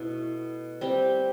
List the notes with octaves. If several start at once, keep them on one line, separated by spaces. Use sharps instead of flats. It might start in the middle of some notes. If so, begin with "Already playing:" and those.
Already playing: B2 A3 E4
G3 C4 G4